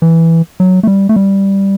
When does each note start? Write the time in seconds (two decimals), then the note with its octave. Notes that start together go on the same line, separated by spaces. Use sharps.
0.02 E3
0.60 F#3
0.83 A3
0.87 G3
1.09 A3
1.16 G3